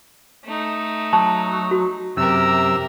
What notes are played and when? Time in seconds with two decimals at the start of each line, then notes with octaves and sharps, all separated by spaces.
0.45 A3 D#4
1.13 F#3 A5
1.71 F#4
2.17 F#2 C3 G4 A#4 E6